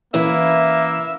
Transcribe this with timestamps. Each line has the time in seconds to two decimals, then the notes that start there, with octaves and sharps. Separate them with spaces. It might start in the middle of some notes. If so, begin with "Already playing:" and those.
0.14 E3 A#3 C#4 E4 B4 E5